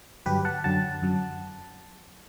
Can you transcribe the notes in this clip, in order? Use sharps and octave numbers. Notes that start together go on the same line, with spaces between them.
G2 D3 F#3 G4 B4
F#5 A5
F#2 D3 F#3 F#5 A5
F#2 D3 F#3